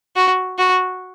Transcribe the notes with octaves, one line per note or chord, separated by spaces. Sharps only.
F#4
F#4